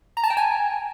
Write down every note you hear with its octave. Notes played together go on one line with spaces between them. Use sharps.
A#5
A5
G5
G#5